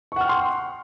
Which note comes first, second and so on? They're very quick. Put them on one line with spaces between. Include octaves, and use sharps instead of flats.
C#6 F#5 F6 G5 C6